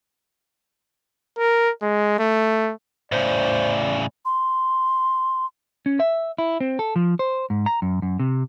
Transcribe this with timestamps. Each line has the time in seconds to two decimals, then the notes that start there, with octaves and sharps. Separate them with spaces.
1.38 A#4
1.82 G#3
2.19 A3
3.12 A2 C#3 C5 D5
4.25 C6
5.86 C#4
6.00 E5
6.38 E4
6.61 C4
6.79 A4
6.96 F3
7.19 C5
7.50 G#2
7.66 A#5
7.82 F#2
8.02 F#2
8.20 C3